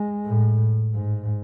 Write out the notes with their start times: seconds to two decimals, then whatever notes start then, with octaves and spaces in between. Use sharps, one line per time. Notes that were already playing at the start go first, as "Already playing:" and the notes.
Already playing: G#3
0.26 A2
0.94 G#2